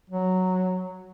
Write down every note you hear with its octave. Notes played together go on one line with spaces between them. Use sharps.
F#3